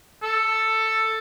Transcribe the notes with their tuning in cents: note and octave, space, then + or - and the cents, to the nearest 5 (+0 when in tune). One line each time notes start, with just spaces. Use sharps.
A4 +10